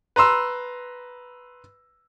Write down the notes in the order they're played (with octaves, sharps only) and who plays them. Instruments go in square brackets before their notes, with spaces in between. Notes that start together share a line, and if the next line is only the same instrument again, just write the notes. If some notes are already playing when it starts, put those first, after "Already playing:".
[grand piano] B4 A#5 C6 E6